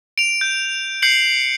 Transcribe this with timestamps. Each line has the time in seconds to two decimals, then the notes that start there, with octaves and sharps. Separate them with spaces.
0.18 D7 F7
0.41 G6
1.02 G6 C7 C#7 F#7